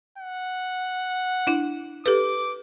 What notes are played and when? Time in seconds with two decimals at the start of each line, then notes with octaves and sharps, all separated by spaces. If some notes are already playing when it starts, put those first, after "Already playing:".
0.18 F#5
1.47 D4 E4
2.06 G4 A4 B4 D6